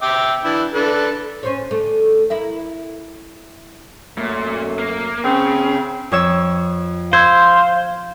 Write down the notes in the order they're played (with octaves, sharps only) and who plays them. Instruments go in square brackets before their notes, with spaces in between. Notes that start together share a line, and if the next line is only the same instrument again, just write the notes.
[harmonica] E5 G5 D6
E3 D4 E4
D4 A4 B4
[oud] C#4 C5 C#5
D3 A3
E4 A#4 E5
[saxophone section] F#2 A3 [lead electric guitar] A#2
[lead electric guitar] A#3
[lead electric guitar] C#3 [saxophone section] C4 G#4
[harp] F2 C#5 E6
[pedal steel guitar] C5 [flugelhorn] F5 [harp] E6 G#6